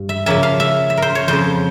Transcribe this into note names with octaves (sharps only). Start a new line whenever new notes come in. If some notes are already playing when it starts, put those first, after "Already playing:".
Already playing: G2
E5
C#3 F3 A#3 C#4 E5
F5
E5
E5
A#4 C5
C#5
F2 C#3 F3 C5